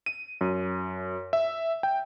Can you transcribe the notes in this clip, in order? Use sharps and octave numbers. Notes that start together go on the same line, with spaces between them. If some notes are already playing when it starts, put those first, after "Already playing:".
D#7
F#2
E5
G5